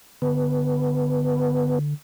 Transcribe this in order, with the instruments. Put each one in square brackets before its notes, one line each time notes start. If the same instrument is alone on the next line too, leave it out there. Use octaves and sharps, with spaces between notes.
[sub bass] D3 [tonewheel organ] B3